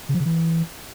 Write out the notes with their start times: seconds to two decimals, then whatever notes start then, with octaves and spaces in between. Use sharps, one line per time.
0.09 C#3
0.15 F3
0.20 C#3
0.26 E3